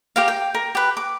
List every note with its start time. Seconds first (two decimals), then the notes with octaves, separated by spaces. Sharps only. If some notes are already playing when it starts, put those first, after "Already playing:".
0.16 G4 A#4 F5
0.28 G5
0.54 A#4
0.75 G4 B4
0.97 D6